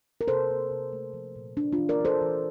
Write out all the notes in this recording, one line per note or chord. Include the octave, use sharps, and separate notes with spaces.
A#4
C3 A4 C5
A#3
C3
A3
F3
A#2
D4
D4 F4
E3
A#4 D5
D4 A4 C5
E3